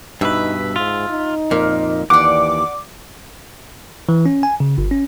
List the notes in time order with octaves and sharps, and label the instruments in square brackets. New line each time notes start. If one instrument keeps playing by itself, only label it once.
[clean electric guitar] G2 B2 B4 [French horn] D#4 [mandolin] E5
[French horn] G#2 [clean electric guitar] F4
[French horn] D#4
[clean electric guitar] F2 A#2 [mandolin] A#3
[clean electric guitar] D#2 [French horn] E3 [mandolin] D5 F#5 [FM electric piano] D6
[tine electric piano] E3
C#4
G#5
C#3
G1
C#4